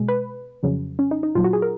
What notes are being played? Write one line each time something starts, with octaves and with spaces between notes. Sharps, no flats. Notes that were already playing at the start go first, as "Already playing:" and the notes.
Already playing: B2 G#3
B4
F2 C#3 F#3
C#4
D#4
D#4
A#2 F#3 F4
F#4
G#4
A#4